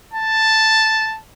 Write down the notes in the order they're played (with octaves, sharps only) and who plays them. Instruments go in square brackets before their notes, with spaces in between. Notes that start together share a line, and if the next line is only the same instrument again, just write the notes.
[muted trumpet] A5